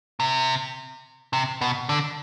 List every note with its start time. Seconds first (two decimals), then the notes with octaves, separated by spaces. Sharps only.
0.20 C3
1.33 C3
1.61 B2
1.89 D3